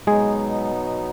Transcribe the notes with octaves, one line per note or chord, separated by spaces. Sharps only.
B2 F#3 G#3 B3 D#4 G#4